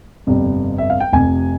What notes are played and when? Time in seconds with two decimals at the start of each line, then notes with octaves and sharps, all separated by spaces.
0.27 G1 F2 C3 G3
0.78 E5
0.90 F5
1.00 G5
1.12 F1 F2 C3 G#5